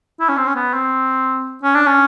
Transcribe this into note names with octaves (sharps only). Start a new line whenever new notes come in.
E4
C#4
C4
C#4
B3
C4
C#4
D4
C#4